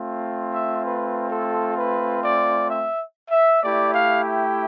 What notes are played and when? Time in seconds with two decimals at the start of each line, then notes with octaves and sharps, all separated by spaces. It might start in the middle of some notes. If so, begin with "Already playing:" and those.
Already playing: A3 C4 F4
0.52 E5
0.84 B4
1.29 A4
1.76 B4
2.22 D5
2.69 E5
3.30 E5
3.62 A3 E4 G4 D5
3.93 F5
4.24 G5